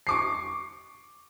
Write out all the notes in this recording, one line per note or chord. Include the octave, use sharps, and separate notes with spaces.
C#6 D6 C7